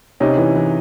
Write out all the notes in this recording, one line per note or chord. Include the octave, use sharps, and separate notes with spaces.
C3 C#4 D#4
E3
E3